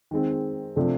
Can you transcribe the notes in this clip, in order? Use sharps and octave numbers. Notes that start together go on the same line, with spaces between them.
D#3 G#3 C4
C3 F3 A3 D4